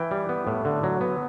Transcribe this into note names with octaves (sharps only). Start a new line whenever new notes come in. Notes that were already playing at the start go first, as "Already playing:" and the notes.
Already playing: E3 G5
G3
B3
A2
D3
F#3
B3